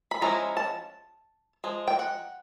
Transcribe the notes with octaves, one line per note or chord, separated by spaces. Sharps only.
B5
F3 G#3 C#4 E4 A#5
A5
F3 G#3
G5
F#5